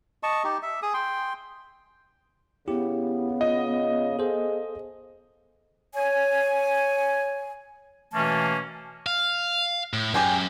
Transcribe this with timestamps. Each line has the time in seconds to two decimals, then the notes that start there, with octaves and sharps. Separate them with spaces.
0.23 D#5 A5 C#6
0.44 D#4 G4
0.63 E5
0.82 G#4 D#6
0.94 G5 C6
2.68 C#3 B3 E4 G4
3.41 F4 D#5
4.19 G#4 A4 C5 F5
5.95 C#5 G#5
8.13 B2 E3 A3 A#3 C#4 A5
9.06 F5
9.93 A2
10.14 F#2 G4 G#4 G5